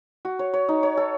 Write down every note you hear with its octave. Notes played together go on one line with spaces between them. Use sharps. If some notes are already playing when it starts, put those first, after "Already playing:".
F#4
C#5
C#5
D#4
C#5
A4